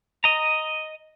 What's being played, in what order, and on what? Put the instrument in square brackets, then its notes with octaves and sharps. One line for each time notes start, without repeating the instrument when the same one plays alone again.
[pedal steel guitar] D#5 A#5